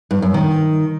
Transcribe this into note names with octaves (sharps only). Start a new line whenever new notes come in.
G2
F#2
D#3